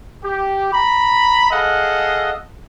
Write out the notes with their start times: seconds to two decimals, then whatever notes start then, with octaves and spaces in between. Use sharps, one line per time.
0.23 G4
0.73 A#5 B5
1.51 G#4 A4 D#5 F5 F#5